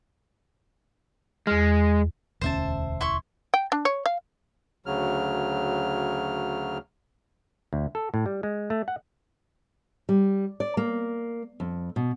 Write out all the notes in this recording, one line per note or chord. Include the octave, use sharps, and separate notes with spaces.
E2 G#3 F6
E1 D2 C#4 C5 E5 A5
E4 C6 C#6
G5
D4
C#5
F5
D2 C#3 F#3 F6
D2
A4
A2
G3
G#3
A3
F#5
G3
D5
A#3
F2
B2